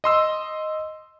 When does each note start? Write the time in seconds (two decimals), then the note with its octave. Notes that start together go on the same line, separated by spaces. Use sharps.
0.04 D#5 C6 E6